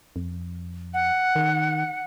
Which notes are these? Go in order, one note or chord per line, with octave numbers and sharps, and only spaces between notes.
F2
F#5
D#3